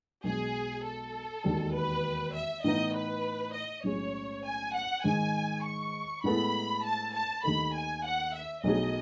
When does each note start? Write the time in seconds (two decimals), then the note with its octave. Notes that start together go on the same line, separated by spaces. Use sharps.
0.24 B1 B2 G#3 G#4
0.84 A4
1.44 E1 D#2 D#3
1.74 B4
2.34 E5
2.64 A2 E3 B3 D#4 D#5
2.94 B4
3.54 D#5
3.84 B1 A2 G#3 C#4 G#4 C#5
4.44 G#5
4.75 F#5
5.04 G#2 D#3 G#3 G#5
5.64 C#6
6.24 A2 G#3 B3 E4 A4 B5
6.84 A5
7.14 A5
7.44 D#2 D#3 A3 D#4 A4 B5
7.74 G#5
8.05 F#5
8.35 E5
8.64 B1 B2 A3 D#4 G#4 D#5